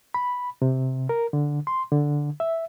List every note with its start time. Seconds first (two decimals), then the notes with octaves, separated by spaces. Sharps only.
0.14 B5
0.62 C3
1.09 A#4
1.33 D3
1.67 C6
1.92 D3
2.40 E5